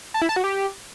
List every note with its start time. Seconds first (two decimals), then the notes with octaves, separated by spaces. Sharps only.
0.14 A5
0.22 E4
0.29 A5
0.36 F#4
0.44 G4